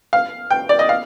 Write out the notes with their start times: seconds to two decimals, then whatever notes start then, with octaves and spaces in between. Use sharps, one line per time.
0.13 F5
0.50 G5
0.69 D5
0.79 D#5
0.89 F5